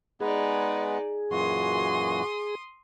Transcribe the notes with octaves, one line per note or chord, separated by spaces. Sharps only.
G#3 B3 D#4 G#4 B4 D5
F#2 A#2 E3 F#4 C6 D#6